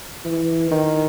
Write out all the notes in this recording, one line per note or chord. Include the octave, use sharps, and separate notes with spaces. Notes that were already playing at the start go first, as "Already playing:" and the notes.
E3
D#3